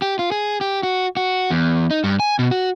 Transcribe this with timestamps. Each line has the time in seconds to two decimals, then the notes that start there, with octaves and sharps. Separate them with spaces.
0.02 G4
0.19 F4
0.32 G#4
0.61 G4
0.83 F#4
1.17 F#4
1.50 E2
1.91 D#4
2.04 G2
2.20 G#5
2.39 B2
2.51 F#4